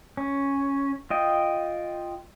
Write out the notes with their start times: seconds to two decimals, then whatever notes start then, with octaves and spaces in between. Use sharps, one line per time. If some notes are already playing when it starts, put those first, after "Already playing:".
0.17 C#4
1.10 F4 D#5 G5